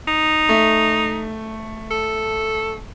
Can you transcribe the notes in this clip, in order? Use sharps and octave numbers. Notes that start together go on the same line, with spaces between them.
D#4
A3
A4